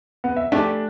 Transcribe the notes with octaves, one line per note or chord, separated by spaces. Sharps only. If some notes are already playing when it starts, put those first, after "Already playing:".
B3
E5
A3 D4 G4 E5